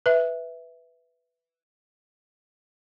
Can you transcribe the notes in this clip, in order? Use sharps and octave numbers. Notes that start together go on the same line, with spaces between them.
B4 E5